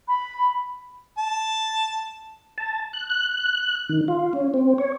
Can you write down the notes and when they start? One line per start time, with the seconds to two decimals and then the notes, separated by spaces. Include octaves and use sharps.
0.08 B5
1.18 A5
2.58 A5
2.93 F#6
3.10 F#6
3.89 D#3
4.08 F4
4.33 C#4
4.54 C4
4.78 C#5